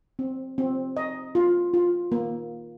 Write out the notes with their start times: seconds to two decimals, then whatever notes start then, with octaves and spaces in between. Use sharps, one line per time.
0.19 C4
0.58 C4
0.97 D#5
1.35 F4
1.74 F4
2.12 A#3